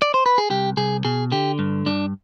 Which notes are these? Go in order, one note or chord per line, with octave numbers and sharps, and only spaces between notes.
D5
C5
B4
G#4
C2 G4
C2 G#4
B2 G#4
D3 G4
G2
G2 D4